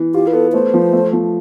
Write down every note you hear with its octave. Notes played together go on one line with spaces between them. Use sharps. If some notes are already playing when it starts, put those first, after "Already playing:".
Already playing: E3
F4 G4
B4
B3 A4
A3 C5
F3
A3
F3